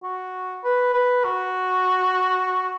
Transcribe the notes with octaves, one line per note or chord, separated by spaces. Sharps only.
F#4
B4
B4
F#4